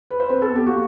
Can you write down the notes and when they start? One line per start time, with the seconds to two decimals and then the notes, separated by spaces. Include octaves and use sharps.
0.10 B4
0.20 C5
0.29 C4 B4
0.42 A4
0.49 B3
0.55 G4
0.67 A#3 F#4